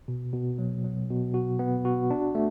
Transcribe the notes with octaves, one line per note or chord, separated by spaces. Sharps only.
B2
B2
F#3
F#3
B2
F#4
B3
F#4
D4
A3